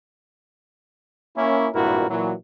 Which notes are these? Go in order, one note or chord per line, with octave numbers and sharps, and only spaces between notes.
A#3 C#4 E4
G#1 G2 A#2 E4 F#4 A#4
A#2 E3 F#3